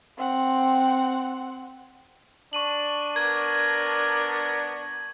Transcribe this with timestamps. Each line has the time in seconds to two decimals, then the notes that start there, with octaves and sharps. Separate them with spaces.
0.17 C4 F#5
2.53 D4 C#6 D#7 F#7
3.16 B3 A#4 D5 G#6